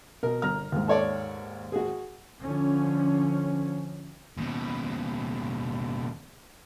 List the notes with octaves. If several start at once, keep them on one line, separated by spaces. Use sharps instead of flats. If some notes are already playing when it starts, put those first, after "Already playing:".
B2 A#4
G1 A#5 F6
D#2 G#2
A4 C#5 D5
F#4 G#4
D3 F3 C#4
D#2 B2